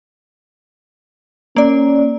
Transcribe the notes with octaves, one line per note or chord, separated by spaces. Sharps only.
A#3 C#4 D5